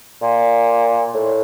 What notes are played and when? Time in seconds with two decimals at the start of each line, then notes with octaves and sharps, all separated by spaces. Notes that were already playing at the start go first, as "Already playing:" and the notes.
0.22 A#2
1.14 A2